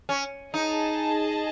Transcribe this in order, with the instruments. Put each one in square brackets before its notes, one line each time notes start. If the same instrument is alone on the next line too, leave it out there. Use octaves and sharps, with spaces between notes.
[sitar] C#4
[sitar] D#4 [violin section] G#4 D#5 A5